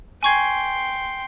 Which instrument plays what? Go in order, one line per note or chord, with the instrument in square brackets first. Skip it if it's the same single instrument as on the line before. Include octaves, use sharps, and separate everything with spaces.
[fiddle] G5 C6 [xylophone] G#5 C#6 G#6